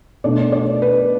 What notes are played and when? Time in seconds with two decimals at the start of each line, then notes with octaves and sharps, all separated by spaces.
0.24 B2 A3 D4 D5
0.52 D5
0.82 B4